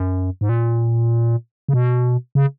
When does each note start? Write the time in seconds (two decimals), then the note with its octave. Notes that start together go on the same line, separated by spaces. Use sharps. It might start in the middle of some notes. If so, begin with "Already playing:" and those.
Already playing: F#2
0.41 G#2
0.49 A#2
1.69 C#3
1.73 B2
2.35 C#3